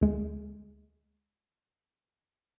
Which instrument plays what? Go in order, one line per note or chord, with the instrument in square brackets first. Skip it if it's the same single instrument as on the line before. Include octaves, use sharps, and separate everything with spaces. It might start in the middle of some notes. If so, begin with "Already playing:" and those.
[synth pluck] D2 G#3